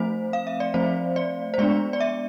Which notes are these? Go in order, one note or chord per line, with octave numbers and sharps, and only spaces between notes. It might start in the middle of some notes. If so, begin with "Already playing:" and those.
Already playing: F3 A3 C4 C5
F5
E5
D5
F3 A3 C4 C5
D5
C5
G#3 B3 D4 D5
D5
E5